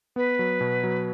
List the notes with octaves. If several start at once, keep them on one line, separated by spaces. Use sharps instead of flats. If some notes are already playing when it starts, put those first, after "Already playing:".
B3 B4
F#3
B2
F#3